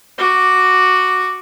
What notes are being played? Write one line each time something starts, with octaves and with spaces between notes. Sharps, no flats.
F#4 D6